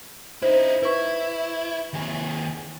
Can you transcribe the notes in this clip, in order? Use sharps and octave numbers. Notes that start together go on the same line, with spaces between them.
D#4 E4 C5
E4 B4 C#6
D#2 G#4